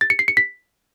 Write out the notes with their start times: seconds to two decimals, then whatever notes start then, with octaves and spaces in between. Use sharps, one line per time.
0.01 A6
0.10 C#7
0.19 C7
0.28 C#7
0.37 B6